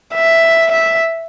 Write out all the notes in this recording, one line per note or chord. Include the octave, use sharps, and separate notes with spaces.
E5
E5